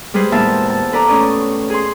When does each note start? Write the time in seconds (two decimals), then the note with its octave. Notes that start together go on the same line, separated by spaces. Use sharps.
0.14 G3 G#3 G#4 B4 C5
0.32 E2 A#2 G#3 E4 E5 A5
0.70 A5
0.92 A4 B4 D5 A#5 D6
1.08 A2 C#4 D5 D#6
1.70 G#4 C6